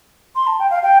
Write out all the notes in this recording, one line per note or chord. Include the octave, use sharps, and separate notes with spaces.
C6
A5
G5
F5
G5